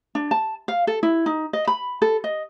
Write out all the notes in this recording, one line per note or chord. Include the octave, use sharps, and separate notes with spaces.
D4
A5
F5
A4
E4
D#4
D#5
B5
A4
D#5